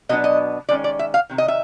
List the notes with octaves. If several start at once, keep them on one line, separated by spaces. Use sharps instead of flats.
B2 F#3 B3 D4 D#5
D#5
D#3 G#3 C#4 D5
D5
E5
F5
C3 D#3
D#5
E5